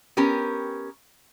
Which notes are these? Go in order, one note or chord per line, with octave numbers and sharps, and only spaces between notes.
B3 C#4 G4 A#4